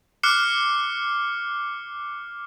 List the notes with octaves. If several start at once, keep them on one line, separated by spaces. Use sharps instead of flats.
D6 F6 F#6 C7 C#7